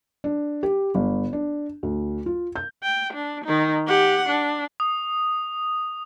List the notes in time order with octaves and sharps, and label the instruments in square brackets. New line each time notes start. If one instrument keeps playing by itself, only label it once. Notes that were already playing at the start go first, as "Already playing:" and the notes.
[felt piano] D4
G4
G1
D4
D2
F4
G6
[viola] G5
D4
D#3 D#4
G4 F#5
D4
[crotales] D#6